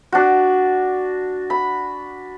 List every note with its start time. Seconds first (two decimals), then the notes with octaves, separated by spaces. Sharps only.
0.12 D4 F#4
1.50 B5